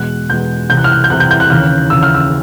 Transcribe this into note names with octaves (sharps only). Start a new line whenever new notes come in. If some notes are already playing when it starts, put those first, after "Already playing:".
Already playing: E2 B2 G#3 F#6
E2 B2 G#3 G6
C2 C3 E3 G6
F#6
F6
F#6
G6
C2 C3 E3 F#6
G6
G6
F#6
D#2 C#3 E3 F6
D#2 C#3 E3 E6
F6
E6